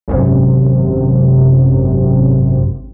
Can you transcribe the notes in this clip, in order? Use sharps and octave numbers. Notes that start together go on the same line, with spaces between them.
G#1 F#2 C3